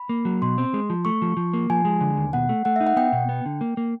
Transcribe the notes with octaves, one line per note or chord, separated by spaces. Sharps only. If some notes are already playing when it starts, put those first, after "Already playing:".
Already playing: B5
A#3
F#3
B2 C6
C4
G#3
F3
A3 C#6
F3
F3
A#3
F3 G#5
G#3
D3
D#2
B2 F#5
A3
A3 F#5
D#4 E5
F#5
B3 G5
B2
B3
D3
A#3
A#3